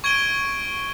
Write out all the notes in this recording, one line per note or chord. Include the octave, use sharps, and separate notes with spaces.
C#6 G#6 D7 D#7 G7